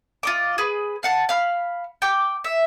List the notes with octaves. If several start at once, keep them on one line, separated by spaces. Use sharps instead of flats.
F4 D#5 D6
G#4 B4
F5 F#5 A5
F5 B5 F6
G5 D6
E5